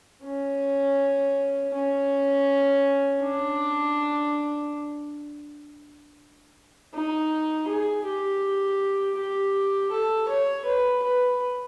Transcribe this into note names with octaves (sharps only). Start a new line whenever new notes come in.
C#4
C#4
D4
D#4
G#4
G4
G4
A4
C#5
B4
B4